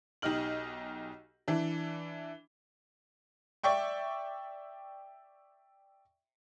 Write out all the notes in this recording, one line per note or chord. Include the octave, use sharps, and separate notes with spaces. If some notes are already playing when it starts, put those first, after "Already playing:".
B1 D#4 G4 D#5 F6 F#7
E3 D4
D5 E5 G5 C#6